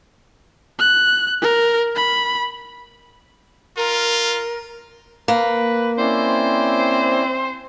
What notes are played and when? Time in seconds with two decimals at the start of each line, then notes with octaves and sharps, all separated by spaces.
0.79 F#6
1.42 A#4
1.95 B5
3.77 F4 A#4
5.28 A#3 B4
5.98 C4 C#4 E4 C5 D5